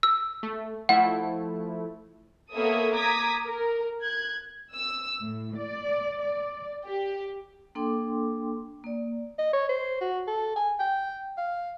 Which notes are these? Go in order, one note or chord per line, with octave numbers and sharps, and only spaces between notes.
E6
A3
F3 A3 E4 F#5
A#3 B3 A4 C#5 E5 D#6
A#5 D6 D#6 G#6 B6
A#4
F#6 G#6
E6
A2
D5
D5
G4
A#3 D4 A4 G5 C6 D6
A#3 D5
D#5
C#5
C5
F#4
A4
G#5
G5
F5